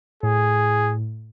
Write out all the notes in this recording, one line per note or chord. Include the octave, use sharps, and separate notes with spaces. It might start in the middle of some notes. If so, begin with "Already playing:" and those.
A2 G#4